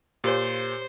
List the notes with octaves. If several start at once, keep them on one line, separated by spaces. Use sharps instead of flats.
A#2 G4 C5 C#5